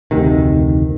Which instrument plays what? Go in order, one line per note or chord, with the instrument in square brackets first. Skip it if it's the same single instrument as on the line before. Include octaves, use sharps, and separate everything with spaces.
[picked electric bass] F1 D2 C3 D#3